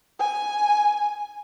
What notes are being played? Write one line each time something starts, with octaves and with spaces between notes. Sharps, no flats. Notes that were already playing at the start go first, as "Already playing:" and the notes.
G#5